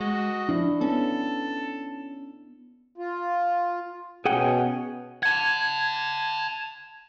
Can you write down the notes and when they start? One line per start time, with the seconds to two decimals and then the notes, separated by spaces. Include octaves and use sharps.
0.01 G#3 F#4 D#5
0.49 F3 D4 E4
0.81 B3 C#4 A4
2.98 F4
4.25 B2 C#4 G#4 F#5 G5
5.23 F#5 A5 G#6